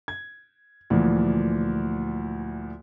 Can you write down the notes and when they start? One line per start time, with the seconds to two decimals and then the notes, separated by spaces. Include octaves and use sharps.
0.08 G#6
0.90 D2 A#2 E3 F3